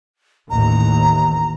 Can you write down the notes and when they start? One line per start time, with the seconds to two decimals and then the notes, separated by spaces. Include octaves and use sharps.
0.50 A1 D#2 A#5